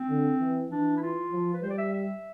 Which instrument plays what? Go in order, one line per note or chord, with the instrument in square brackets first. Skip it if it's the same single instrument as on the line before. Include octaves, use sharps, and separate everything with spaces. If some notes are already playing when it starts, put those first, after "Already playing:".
Already playing: [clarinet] C4
[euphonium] D3
E3
[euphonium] E3 [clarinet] D4
[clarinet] E4
F4
[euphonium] F3
[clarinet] B4
[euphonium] G3 [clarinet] C5
[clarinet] D5
E5
E5